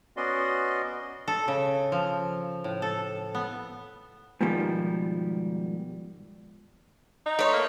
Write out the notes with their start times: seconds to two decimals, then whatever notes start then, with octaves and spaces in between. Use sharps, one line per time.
0.17 B3 C#4 F#4 D5 D#5 C6
1.28 A4
1.48 C#3
1.92 F3
2.64 A2
2.82 A4
3.35 B3
4.41 G#2 B2 D#3 F3 G3
7.26 D#4
7.39 A3 C#5
7.53 A#3